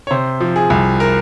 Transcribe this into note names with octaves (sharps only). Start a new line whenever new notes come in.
C#5
C3 C5
F3
G#4
C2
A#4